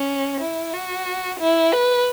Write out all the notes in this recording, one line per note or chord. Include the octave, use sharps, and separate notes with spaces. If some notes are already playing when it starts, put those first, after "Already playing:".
Already playing: C#4
E4
F#4
E4
B4